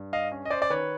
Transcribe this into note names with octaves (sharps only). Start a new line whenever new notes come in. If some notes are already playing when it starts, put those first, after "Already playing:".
Already playing: G2
D#5 F5
C#4
D#5
C5 D5
D5
D#3 B4 C#5